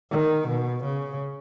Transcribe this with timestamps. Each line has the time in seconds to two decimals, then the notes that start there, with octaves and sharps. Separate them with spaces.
0.11 D#3
0.48 B2
0.83 C#3